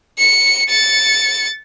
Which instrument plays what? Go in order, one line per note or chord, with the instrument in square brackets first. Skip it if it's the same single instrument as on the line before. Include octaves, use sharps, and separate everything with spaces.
[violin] C#7
A6 C#7